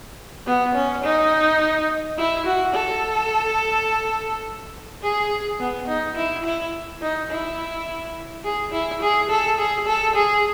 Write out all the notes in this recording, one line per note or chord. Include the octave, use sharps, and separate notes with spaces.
B3
C#4
D#4
E4
F#4
A4
G#4
B3
D#4
E4
E4
D#4
E4
G#4
E4
G#4
A4
G#4
A4
G#4